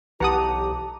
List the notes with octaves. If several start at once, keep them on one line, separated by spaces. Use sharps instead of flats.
B1 E3 G4 F#5 A5 A#5 D#6